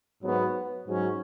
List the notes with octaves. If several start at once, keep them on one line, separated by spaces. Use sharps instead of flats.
G#2 F#3 B3 F#4
G#2 F#3 C#4